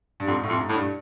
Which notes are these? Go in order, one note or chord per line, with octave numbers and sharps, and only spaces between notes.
G2
F2 G#2
A2
F2
G#2
A2
G2